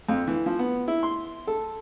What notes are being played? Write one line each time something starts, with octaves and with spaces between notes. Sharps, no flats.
F2
E3
F3
B3
E4
C6
A4